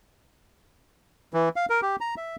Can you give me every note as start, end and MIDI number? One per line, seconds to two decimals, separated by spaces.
1.34 1.49 52
1.56 1.66 77
1.70 1.81 70
1.82 1.96 67
2.01 2.15 82
2.17 2.36 76